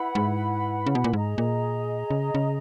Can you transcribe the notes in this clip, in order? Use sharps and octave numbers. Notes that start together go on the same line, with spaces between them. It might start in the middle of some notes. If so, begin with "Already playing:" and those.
Already playing: E4 B4 F#5 B5
G#2
C#3
B2
A#2
G#2 G#4 D#5 A#5
A#2
C#3
C#3